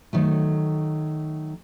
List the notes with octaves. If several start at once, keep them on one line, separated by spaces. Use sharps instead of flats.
D#3 F#3 A3